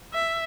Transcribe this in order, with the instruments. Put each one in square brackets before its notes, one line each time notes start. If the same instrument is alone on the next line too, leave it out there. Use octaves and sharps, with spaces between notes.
[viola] E5